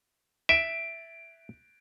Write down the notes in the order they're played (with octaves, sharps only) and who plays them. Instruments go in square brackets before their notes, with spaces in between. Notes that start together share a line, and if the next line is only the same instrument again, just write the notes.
[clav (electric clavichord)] E5 [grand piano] D7